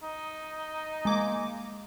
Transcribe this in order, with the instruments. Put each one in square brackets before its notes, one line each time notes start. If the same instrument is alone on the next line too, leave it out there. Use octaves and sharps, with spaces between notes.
[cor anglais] D#4
[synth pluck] G#3 A#3 D6